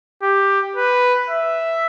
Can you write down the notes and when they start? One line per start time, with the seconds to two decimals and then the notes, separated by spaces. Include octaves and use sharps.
0.23 G4
0.76 B4
1.30 E5